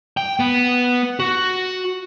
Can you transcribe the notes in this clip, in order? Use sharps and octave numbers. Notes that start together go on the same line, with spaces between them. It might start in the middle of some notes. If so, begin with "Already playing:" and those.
G5
B3
F#4